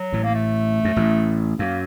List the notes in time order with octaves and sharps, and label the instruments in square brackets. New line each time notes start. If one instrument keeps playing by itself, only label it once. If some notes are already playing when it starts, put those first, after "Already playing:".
Already playing: [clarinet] F#3
[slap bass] A1 A2
[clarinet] A#3
A3
[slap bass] F#2
A1 A2
[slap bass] F#2 [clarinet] A#3